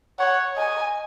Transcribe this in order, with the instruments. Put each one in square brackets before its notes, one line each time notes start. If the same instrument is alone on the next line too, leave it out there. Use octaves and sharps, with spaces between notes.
[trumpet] C#5 [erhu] F#5
[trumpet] D#5 [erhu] G#5